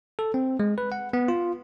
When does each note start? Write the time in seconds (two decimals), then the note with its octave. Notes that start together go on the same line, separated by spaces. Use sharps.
0.19 A4
0.34 C4
0.60 G#3
0.78 B4
0.92 F#5
1.13 B3
1.28 F4